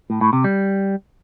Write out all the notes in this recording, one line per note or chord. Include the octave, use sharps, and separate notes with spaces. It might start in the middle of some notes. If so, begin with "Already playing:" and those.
A2
A2
C3
G3